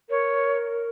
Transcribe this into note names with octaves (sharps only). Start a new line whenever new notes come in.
A#4 C#5